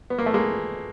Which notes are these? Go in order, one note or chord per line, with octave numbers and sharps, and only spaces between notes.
B3
A#3
A3
G#3 A#3